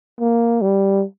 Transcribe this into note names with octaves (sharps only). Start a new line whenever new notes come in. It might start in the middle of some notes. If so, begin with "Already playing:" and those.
A#3
G3